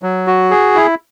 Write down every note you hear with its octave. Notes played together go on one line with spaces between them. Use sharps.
F#3
F#4
G#4
E4